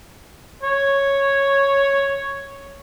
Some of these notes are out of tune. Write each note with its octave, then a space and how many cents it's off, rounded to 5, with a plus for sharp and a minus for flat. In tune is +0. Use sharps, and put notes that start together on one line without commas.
C#5 -5